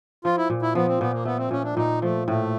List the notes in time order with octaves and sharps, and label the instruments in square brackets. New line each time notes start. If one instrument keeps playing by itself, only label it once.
[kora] F3 [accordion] F4
[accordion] E4
[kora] A#2
[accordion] E4
[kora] F3 [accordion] B3
[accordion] C4
[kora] A#2 [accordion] B3
[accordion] A#3
[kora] A3 [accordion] B3
[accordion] C4
[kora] A#2 [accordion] C#4
[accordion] D4
[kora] A#2 [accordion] D#4
[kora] F3 [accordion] A3
[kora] A2 [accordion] A3